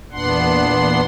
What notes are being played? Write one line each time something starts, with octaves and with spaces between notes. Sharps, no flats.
E2 A#2 B3 D4 F#5 C6